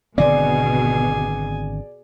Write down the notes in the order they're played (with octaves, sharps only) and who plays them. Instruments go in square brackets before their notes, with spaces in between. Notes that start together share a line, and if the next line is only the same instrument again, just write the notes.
[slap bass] G#1 D3 C4 [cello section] B2 [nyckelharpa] G#4 G#5 [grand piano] D5